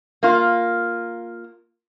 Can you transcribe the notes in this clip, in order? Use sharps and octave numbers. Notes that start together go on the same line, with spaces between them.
A#3 F4